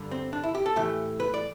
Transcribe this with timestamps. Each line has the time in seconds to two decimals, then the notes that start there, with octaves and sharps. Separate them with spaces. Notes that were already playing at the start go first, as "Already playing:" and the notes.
Already playing: G2 D3 G3
0.11 C4
0.33 D4
0.43 E4
0.55 G4
0.66 A4
0.76 A2 E3 A3 G4
1.20 B4
1.34 D5